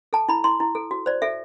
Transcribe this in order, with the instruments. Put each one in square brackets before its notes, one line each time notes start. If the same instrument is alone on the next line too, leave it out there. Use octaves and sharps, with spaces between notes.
[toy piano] A4 A5
E4 B5
E4 C6
E4
A4
F#4
C5 D5
A4 E5